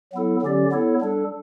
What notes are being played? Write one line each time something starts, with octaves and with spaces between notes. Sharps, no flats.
F#3 B3 E4 A4
D3 F#3 C#4 G4 D5
B3 E4 A4 C#5
G3 D4 A4